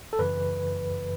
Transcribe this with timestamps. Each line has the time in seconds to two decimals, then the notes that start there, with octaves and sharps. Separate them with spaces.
0.13 A4
0.19 F#2 C#3 E3 B4